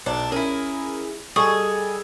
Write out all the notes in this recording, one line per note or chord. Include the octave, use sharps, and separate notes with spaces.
B1 D4
C#4 E4 G#4 A#4
G3 G#4 A4 D#5 C#6 D#6